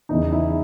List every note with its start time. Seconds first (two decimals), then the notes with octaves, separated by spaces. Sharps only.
0.09 E2 C#3 E3 D#4
0.32 E4